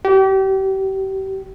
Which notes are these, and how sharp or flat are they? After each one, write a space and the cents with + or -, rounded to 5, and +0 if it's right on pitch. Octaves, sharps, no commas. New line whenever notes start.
G4 -35